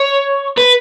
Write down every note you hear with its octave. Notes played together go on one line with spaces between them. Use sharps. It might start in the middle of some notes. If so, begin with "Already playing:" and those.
Already playing: C#5
B4